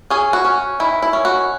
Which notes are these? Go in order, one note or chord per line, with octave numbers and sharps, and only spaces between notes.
C#4 G#4
F#4
C#4
D#3 E4
E4
C#4
F#4